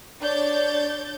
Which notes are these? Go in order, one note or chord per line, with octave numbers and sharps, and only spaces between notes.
D4 C#5 D5 G6 A6